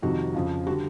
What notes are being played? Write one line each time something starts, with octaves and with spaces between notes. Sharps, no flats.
F2 C3 D#3 G3 F#4
F2 C#3 F3
D3 G3 F#4